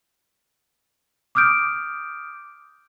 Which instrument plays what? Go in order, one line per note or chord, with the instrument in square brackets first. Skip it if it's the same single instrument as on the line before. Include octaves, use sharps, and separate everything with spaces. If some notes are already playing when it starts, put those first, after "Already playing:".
[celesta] D6 D#6 F6 G6 D7